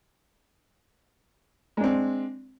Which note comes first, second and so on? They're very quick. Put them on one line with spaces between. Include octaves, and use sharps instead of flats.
G#3 D4 C4